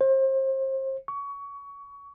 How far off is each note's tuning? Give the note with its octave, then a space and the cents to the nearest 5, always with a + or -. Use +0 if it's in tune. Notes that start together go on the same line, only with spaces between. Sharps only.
C5 +35
C#6 +25